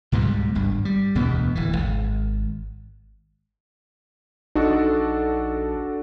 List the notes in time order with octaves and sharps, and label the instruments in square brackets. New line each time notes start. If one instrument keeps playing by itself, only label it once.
[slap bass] C#2 G#2 B2 G3
G#1 G2
G3
E1 D2 B2 B3
D1 E3
G#1
[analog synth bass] A#1 [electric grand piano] D4 F#4 A4 [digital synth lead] D#4